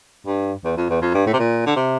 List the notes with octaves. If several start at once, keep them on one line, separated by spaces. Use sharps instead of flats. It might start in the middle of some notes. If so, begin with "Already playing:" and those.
G2
E2
F2
E2
F2
G2
A2
C3
A#2
D3
C3